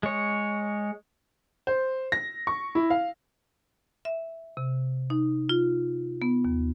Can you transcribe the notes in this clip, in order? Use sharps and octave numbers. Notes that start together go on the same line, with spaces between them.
G#3 C#5
C5
A#6
C#6
E4
F5
E5
C3
D#4
F4
B3
D#2